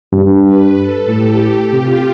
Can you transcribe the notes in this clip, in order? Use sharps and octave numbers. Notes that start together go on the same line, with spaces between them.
G2
B4
A4
A2 G4
G4
C3 F4